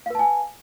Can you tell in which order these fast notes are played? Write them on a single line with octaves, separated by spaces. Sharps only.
F5 B4 A5 G#5